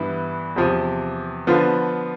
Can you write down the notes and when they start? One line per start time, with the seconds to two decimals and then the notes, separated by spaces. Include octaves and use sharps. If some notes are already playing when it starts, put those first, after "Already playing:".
Already playing: G2 E3 B3
0.56 E2 C3 F3
1.47 D3 F3 B3 F4